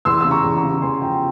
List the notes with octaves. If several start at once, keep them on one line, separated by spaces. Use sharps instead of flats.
E2 C6 E6
C#3 E6
A#5 C#6
E2
A#5 C#6
C#3
E2 G#5 C6
F3 G5 A#5